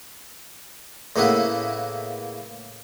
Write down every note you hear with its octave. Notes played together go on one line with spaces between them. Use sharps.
A2 C#3 A#3 B3 E4 B4